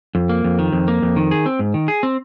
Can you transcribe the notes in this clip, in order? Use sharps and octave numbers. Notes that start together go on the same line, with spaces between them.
F2
A#3
F2
D#3
F2
A#3
F2
D#3
G#4
C4
G#2
D#3
G#4
C4